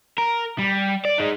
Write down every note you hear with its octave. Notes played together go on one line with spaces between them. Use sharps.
A#4
G3
D5
G#3 D#4